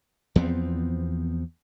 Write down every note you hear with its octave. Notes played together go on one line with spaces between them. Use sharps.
E2 F3 B3 C4